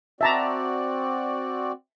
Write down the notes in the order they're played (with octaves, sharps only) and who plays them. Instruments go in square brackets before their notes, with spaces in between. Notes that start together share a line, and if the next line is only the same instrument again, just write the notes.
[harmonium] C4 F#4 D5 [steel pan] E5 A5 A#5